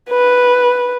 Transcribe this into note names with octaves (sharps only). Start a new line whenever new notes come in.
B4